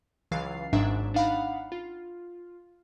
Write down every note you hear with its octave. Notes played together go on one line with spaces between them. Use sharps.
C#2 E3 F#3 F5 A6 C7
G#1 G#2 F#3 D4 E5
D4 D#4 F5 F#5 B5
F4